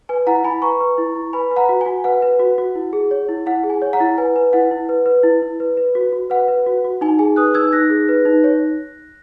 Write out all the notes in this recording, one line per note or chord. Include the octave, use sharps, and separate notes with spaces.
B4 G#5
E4 F#5 A#5
E4 G#5 B5
B4 A#5 C#6
B4
E4
E4
B4 G#5 B5
B4
F#5 A#5
F#4
G#5
F#4
B4 F#5
B4
F#4
F#4
E4
G#4
C#5
E4
E4 F#5
G#4
G#5
C#5
F#5 A#5
E4
B4 G#5
B4
E4 F#5
E4
B4
B4
E4
E4
B4
B4
F#4
F#4
B4 F#5
B4
F#4
F#4
D#4 G#5
G#4 G#5
B4 D#6 F#6
D#4 E6 G#6
D#4 F#6 A#6
G#4
B4
D#4
C#5